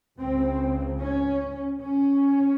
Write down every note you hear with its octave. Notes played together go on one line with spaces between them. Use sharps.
C#2 C#3 C4
C#4
C#4